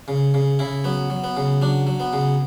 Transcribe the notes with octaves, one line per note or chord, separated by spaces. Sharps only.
C#3
C#3
C#3 E4
F#3 B3
F#3
B3
C#3
F#3 D4
F#3
B3
C#3